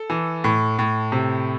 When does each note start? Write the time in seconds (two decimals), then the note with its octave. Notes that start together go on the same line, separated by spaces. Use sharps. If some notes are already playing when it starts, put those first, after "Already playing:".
Already playing: A4
0.10 E3
0.44 A2
0.79 A2
1.12 C3